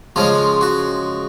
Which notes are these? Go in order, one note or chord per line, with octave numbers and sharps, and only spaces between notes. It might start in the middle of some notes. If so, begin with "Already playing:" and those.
C#3 F3 G#3 F4
F#4